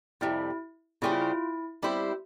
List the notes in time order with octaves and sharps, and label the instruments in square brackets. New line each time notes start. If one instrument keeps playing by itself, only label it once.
[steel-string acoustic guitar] F2 C3 G3 [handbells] E4
[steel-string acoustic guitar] C#3 G3 C#4 G4 C5 [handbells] E4
[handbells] F4
E4
[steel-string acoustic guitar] G3 C4 E4 G4 C5